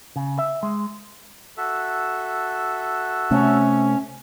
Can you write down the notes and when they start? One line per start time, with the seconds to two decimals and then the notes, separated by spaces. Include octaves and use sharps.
0.16 C#3
0.39 E5
0.63 G#3
1.57 F#4 A4 E5
3.31 C3 A3 C#4